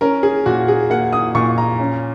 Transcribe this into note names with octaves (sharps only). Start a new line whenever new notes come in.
C#4 A#4
G#4
A#2 F#4
G#4
A#3 F#5
D#6
A#2 C#6
A#5
C#4